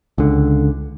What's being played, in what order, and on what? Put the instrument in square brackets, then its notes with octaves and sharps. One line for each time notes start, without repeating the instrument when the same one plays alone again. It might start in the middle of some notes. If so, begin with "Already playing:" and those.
[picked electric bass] C#2 D3